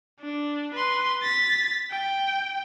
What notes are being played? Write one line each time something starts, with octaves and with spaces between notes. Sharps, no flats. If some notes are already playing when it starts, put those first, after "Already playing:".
D4
B4 C6
A6 B6
G5